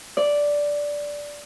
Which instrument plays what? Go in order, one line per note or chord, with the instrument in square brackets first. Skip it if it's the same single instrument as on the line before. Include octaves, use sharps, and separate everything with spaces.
[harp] D5